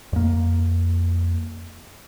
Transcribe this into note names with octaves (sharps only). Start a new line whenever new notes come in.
F2 A#3